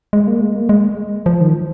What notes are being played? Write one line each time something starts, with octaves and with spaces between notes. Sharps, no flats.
G#3
A#3
G#3
A#3
G#3
F3
D#3
F3